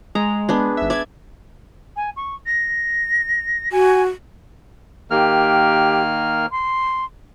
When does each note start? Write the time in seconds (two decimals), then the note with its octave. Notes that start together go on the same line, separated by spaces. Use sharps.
0.15 G#3 A#5
0.49 B3 D4 G#4
0.77 G#1 E5
0.90 D5 E5 G#6
1.96 G#5
2.16 C#6
2.46 A#6
3.72 F#4 G#5
5.11 D#3 A#3 G4 F6
6.51 C6